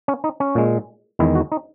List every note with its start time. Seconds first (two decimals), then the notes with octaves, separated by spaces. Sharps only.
0.08 C#4
0.24 D#4
0.40 C#4
0.55 A#2 G#3
1.19 E2 D#3 G#3 E4
1.35 F#4
1.52 D#4